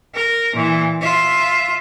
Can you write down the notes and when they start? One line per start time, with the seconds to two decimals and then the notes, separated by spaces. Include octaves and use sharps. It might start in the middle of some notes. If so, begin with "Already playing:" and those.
0.15 A#4
0.53 A#2 E3
1.01 F4 E5